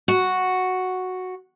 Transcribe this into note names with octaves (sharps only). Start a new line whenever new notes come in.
F#4